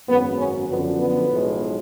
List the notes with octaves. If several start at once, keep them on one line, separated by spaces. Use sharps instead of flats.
G#1 F#2 C#3 F#3 B3
C#4
F#2 D3 F3 B3
B3
B1 A2 F3 G#3